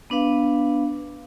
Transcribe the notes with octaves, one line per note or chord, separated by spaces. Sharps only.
B3 D4 B4 F5